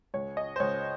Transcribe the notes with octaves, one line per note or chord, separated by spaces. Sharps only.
C#2 C#5
D#5
C5
C#2 C#5